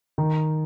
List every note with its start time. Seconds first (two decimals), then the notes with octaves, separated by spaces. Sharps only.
0.18 D#3